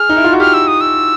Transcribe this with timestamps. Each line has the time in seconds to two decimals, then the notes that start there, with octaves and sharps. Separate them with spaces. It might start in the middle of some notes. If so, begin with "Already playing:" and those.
Already playing: G#4 F6
0.09 D#4
0.17 E4
0.24 F4
0.32 F#4
0.40 G4 F6
0.54 E6
0.68 D#6
0.81 E6